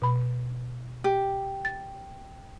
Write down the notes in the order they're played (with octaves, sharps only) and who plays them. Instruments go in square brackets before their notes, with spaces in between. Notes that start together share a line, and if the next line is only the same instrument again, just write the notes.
[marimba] B2 B5
[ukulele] G4
[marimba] A6